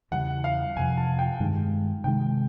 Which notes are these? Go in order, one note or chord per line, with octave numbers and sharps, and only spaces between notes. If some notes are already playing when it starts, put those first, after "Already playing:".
E2 C#3 E3 G3 F#5
F5
F2 C3 F3 G#5
A5
G5
G2 D#3 G#3
C3 D#3 G#3 G5